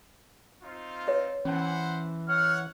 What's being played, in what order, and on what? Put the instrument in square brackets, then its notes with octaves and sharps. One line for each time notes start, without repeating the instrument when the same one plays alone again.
[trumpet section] C4 D#4 F4
[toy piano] B4 C#5 E5
[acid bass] E3 [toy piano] C#4 A5 [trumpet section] B4 C5 F#5
[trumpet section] C#5 F#5 [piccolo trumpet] F6